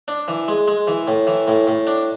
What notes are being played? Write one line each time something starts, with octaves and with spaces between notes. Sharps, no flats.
D4
E3
G#3
G#3
E3
A2
E3
A2
A2
D4